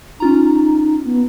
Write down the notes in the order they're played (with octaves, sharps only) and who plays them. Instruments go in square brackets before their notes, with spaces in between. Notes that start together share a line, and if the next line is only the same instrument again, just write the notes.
[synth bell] C#4 F4 A#5 [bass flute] D#4
[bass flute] B3